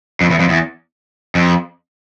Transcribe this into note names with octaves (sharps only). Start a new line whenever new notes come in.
F2
E2
F2
E2
F2